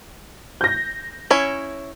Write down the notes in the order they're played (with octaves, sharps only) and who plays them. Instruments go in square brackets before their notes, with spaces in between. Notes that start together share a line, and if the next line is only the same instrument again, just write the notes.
[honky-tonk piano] G6 A#6
[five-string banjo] C#4 E4 C#5